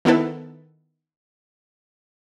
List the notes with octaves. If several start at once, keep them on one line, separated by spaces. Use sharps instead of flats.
D#3 B3 E4 A4 B4